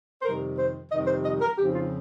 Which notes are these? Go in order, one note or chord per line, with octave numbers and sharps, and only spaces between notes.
C5
F2 C3 D#3 G3 A#4
C5
F2 C3 D#3 G3 D#5
C5
D#5
A#4
F2 C#3 F3 C4 D#4 G4
F4